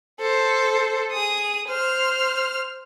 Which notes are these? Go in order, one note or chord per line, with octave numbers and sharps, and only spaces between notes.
A4 C5
G#4 D#6
C5 F6